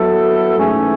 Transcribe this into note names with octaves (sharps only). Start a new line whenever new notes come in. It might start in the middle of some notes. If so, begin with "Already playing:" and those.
Already playing: F#3 B3 E4 A4
G#2 E3 A3 C#4 G#4